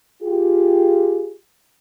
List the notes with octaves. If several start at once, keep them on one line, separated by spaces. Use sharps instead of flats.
F4 G4 G#4